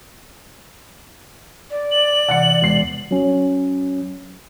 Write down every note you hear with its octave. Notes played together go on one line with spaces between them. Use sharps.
D5
F#7
C3 E3 F#5 C#7
E1 C7
F#3 C#4